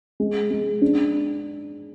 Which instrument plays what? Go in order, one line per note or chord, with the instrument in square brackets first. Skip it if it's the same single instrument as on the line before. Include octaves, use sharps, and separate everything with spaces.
[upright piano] G#3
G#3
D4